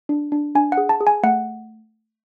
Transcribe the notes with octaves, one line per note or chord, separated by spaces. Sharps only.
D4
D4
D4 G#5
F#5
G#4
A5
G#4
G#5
A3 F#5